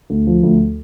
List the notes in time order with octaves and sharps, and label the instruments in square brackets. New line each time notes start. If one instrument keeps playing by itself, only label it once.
[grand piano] D2
F3
D2